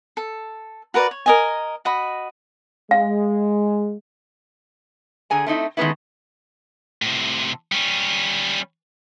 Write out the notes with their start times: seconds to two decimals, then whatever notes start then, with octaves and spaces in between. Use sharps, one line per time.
0.17 A4
0.94 F#4 A#4 B4 D5
1.11 C#5
1.26 A#4 D#5 G#5
1.85 F#4 D#5 B5
2.91 G#3 F5
5.30 D3 G#4 G#5 A#5
5.46 A3 C4 D#4 E4
5.77 D#3 G#3 A3 B3 C#4 E4
7.02 A2 C3
7.72 G3 C#4